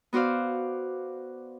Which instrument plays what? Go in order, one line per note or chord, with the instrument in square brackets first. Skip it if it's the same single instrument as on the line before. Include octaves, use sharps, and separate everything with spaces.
[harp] B3 F#4 C5 D5 F5